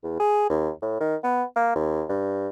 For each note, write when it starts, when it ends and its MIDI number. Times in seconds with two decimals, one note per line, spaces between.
0.04 0.16 40
0.20 0.49 68
0.50 0.70 39
0.82 0.97 45
1.01 1.16 51
1.24 1.44 59
1.56 1.71 58
1.75 2.04 39
2.09 2.48 43